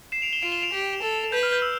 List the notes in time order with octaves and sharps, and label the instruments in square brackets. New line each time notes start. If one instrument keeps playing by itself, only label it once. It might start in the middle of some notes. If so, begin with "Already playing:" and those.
[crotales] C7 E7
D7 F7
E7 G7
[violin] F4 [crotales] D7 F7
[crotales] E7 G7
D7 F7
[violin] G4
A4
[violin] B4 [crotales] G6
[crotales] F6
G6
E6